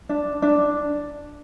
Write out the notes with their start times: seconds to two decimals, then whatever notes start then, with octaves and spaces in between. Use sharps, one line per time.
0.09 D4
0.42 D4